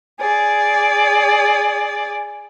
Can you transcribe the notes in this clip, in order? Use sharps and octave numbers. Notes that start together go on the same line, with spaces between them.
G#4 D5